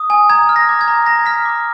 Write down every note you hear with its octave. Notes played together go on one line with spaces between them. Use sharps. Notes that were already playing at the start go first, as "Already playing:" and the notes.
Already playing: D#6
G#5
A#5 G#6
F6
A#6
D6
G#6
A#5
A#5 A#6
F6 B6
D6